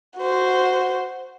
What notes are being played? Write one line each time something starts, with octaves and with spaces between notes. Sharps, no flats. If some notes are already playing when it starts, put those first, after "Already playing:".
F#4 C5